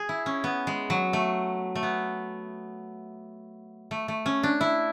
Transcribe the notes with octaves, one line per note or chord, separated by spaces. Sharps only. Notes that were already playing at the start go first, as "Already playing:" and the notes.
Already playing: G#4
E4
C#4
B3
G#3
F#3
A3
A3
B3
A3
A3
C#4
D4
E4